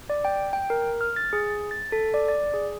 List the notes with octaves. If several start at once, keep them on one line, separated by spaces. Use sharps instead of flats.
D5
G5
G5
A#4
F6
A6
G#4
A6
A4
D5
D5
G#4